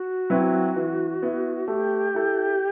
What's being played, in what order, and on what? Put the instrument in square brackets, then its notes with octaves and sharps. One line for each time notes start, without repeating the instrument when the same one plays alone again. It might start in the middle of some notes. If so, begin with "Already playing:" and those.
Already playing: [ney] F#4
[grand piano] F#3 C4 E4 B4
E3
B3 E4
[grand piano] A3 [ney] G4
[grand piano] E4 A4